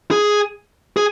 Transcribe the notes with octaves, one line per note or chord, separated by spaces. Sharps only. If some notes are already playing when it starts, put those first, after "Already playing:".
G#4
G#4